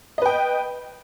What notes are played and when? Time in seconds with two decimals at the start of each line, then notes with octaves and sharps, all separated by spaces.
0.18 D#5
0.22 B4
0.25 G5